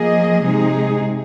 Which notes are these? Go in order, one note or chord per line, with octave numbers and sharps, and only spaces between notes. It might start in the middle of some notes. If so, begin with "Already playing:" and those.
Already playing: F3 A#3 G#4 D#5
C3 G#3 D#4 G#4